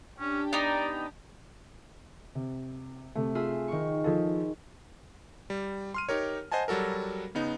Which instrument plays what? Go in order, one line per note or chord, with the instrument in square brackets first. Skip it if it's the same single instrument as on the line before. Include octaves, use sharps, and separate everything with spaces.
[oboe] C#4 [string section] D4 G4
[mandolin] B3 D#4 [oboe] D5
[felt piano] C3
C3 A3
[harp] F4 G#4 E5
D#3 C#6
[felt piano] F3 G#4 A4
[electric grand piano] G3
C6 F6 D#7
D#4 G4 A#4 C#5
C5 D#5 F#5 G#5 A5
F#3 G3 F#4 A4 A#4
C#3 B3 D#4